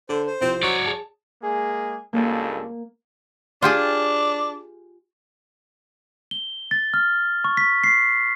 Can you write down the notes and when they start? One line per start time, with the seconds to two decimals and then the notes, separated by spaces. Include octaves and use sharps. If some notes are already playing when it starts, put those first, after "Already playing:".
0.09 D3 A4 C5
0.27 C5
0.41 C2 F3 C4 G4
0.63 F#3 C#5 D5 C#6
0.86 G#4 A5
1.42 G#3 A#3 G#4
2.13 C#2 G2 A#3 A4
3.62 D4 F4 G4 G#4
6.31 G7
6.71 A6
6.94 F6
7.44 C#6
7.57 B6
7.84 C7